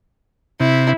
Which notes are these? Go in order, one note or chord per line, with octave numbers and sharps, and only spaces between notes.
C3 E4